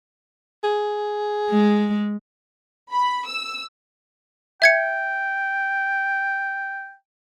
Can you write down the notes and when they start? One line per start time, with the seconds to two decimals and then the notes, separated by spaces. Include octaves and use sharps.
0.64 G#4
1.51 G#3
2.92 B5
3.26 E6
4.62 E5 G5 G#6 C#7